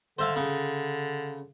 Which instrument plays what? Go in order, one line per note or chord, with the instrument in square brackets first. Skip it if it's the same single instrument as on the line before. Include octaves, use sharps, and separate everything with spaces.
[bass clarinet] D3 [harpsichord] C5 E5 F5
[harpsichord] C#3